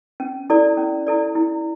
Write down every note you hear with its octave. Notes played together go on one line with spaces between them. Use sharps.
C#4
E4 A4 D5
C#4
E4 A4 D5
E4